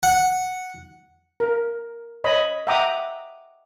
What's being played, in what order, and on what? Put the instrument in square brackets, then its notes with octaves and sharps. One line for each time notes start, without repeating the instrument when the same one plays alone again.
[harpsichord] F#5
[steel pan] A#4
C#5 D#5 B5
E5 F#5 G5 A#5 D6 D#6